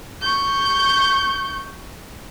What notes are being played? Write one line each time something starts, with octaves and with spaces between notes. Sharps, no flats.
C#6 G6